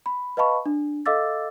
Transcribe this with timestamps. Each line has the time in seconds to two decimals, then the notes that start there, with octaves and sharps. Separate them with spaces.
0.06 B5
0.37 B4 D#5 F5 A5 B5 C#6
0.66 D4
1.06 A4 D#5 F5 D6 E6 A6